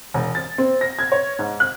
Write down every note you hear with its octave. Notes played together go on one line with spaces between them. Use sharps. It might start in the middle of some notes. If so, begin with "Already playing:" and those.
E1
A6
C4
A#6
G#6
C#5
G#2
F#6